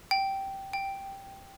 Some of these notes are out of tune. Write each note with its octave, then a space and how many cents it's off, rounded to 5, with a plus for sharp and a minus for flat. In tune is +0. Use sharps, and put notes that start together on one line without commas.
G5 -10
G5 +0